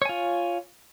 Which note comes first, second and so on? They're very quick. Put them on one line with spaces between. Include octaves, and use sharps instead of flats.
C#5 G#5 F4